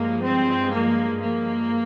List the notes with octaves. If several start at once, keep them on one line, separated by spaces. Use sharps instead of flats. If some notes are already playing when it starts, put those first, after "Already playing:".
Already playing: G2 F3 G#3 A#3
C4
A#3
A#3